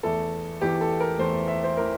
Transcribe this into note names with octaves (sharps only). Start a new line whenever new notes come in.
E2 E3 A3 A4
E2 E3 A3 G4
A4
A#4
E2 E3 A3 C5
E5
C5
E3 A3 A#4